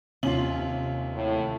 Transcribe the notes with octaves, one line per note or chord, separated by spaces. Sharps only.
D#2 C3 C#4 F4 F#7
A2